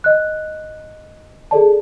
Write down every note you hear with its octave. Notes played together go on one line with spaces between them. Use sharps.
D#5 F#6
G#4 A4 D5 A5